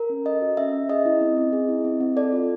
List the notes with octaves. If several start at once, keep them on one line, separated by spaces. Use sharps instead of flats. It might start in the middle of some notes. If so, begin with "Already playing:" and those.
Already playing: A#4
C#4
A4 D#5
F#4
C#4 E5
C#4
G#4 D#5
E4
C4
C4
G#4
E4
C4
C4
A4 D5
F4